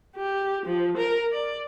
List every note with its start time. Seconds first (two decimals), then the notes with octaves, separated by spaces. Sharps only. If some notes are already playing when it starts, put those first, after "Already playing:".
0.16 G4
0.66 F3
0.97 A#4
1.32 D5